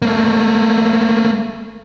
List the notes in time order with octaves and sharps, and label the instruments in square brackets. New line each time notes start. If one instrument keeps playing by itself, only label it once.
[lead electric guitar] A3 A#3